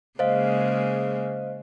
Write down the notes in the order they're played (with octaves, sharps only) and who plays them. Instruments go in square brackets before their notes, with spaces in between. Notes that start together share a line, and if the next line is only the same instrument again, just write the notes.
[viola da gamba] C#3 G#3 A#3 [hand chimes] C5 D#5 F5